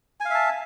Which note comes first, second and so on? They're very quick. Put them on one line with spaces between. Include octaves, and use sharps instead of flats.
G#5 F5 E5 A5